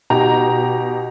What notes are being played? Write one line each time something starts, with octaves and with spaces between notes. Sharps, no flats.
B2 D#4 G4 A#5